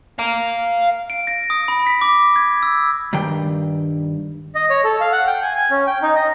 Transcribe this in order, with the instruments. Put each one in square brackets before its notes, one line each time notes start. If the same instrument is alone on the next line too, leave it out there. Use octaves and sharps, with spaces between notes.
[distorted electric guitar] F5 A#5
[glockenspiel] D7
A#6
D#6
B5
B6
D6
G#6
E6
[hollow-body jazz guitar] G2 D#3 G5
[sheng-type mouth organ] D#5
C#5
A4
F5
F#5
G5
G#5
G#5
C#4
G5
D#4
D#5